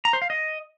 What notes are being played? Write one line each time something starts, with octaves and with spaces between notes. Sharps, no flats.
A#5
C5
F5
D#5